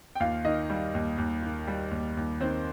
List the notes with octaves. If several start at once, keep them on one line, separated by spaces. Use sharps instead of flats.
G5
D#2 F4 F5
D#3 D#4 D#5
G3
D#2
D#2
D#3
G3
D#2
D#2
D#3 C4 C5